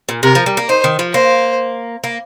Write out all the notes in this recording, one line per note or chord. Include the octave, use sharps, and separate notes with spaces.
A#2
C3 A#4
F3
G3
A#3
D#4 C5
D#3
F3
A#3 C5
A#3